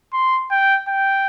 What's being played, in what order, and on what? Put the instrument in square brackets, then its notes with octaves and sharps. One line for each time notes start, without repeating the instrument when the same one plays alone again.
[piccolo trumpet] C6
G5
G5